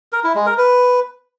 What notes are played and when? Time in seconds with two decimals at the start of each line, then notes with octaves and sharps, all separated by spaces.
0.13 A#4
0.24 E4
0.35 G#3
0.46 A#4
0.58 B4